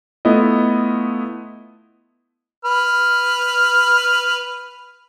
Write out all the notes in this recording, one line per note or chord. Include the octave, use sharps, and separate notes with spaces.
A3 B3 E4 F4 D#5
B4 F6